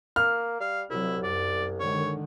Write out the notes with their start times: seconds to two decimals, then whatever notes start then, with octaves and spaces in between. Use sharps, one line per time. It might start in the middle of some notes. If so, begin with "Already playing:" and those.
0.16 A#3 F6
0.60 G3 F5
0.90 C2 C3 F#3 E4
1.23 F#2 D5
1.80 D3 D#3 G#3 C#5